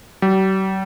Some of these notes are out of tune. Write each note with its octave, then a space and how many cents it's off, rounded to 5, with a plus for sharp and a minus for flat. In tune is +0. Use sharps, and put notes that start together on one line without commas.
G3 -45